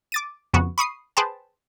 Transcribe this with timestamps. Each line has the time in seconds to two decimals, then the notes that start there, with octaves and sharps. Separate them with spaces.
0.12 D6 A6 D#7
0.54 F2 C#3 B3 F#4
0.78 B5 C#6 D#6 C7
1.17 G#4 B4 C5 G5 A5